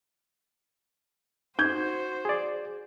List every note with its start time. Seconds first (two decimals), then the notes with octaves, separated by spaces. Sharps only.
1.59 D#4 F#4 C5 G6 G#6
2.25 G#4 D5